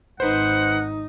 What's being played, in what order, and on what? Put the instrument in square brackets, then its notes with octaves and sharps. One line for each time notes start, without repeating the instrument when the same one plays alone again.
[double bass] G#1 D#4 [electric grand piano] B4 C5 [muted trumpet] F#5